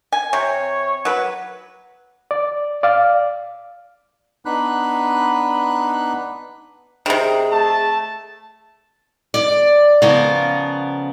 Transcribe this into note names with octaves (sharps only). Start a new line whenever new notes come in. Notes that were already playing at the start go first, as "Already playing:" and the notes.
G#5
C3 C#5
F#3 B4
D5
D5 F5
B3 D4 D#4 B5 F#6
C3 D#3 G#4
A3 A5
D5
C#3 F3 B3 A#4